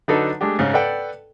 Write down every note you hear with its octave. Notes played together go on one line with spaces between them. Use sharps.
D3 F#3 D4 D#4 A4 B4
G#3 A3 D4 G4
G#2 C#3 C#4
A4 B4 D5 F#5 G5